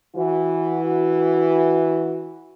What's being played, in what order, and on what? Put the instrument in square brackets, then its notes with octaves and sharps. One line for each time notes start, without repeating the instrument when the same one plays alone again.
[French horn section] E3 F#4